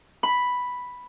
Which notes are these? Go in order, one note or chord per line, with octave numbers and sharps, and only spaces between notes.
B5